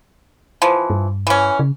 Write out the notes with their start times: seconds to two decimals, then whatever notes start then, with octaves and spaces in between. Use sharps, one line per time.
0.62 E3 F3
0.90 G2
1.27 E3 C#4
1.59 C#3